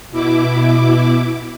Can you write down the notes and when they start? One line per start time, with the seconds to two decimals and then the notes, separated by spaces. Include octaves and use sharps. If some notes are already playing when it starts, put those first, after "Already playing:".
0.11 B2 E4 D6